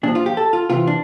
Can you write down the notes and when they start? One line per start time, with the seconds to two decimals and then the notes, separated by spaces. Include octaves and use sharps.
0.03 A#2 F3 D4
0.15 F4
0.26 G4
0.37 A4
0.53 F4
0.70 C3 E3 F4
0.87 D4